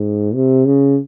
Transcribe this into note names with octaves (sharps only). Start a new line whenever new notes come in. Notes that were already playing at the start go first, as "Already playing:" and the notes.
Already playing: G#2
C3
C#3